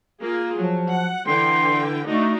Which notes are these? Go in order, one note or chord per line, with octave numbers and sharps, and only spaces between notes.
A#3 F4 G#4
F3 F#3
F#5
D3 E3 G5 C6
A3 D4 D#4 F#4